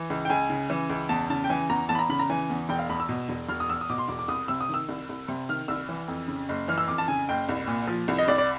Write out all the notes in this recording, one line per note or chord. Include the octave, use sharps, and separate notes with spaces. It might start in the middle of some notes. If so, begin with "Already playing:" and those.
Already playing: E3
C#2
G5
C#2 G#5
C#3
E3
C#2
E2 A5
C#3 A5
G5
E3 G#5
E2 A#5
E2 A5
B5
A#5
C#3 B5
A#5
E3 G#5
E2
E1 G5
F5
E2 B5
E6
B2
E1
E1 F6
D#6
E2 E6
D#6
B2 D6
C6
E1 D6
D6
C2 D#6
C3 E6
D#6
D#3 E6
C2
C2
C3
D#3 F6
C2 E6
E3
F2
C#3
F#1
E3 F6
E6
F2 D6
A5
C#3 G#5
F#1 G5
C2
A#2
F3
C2
D#5
C2 D5
D5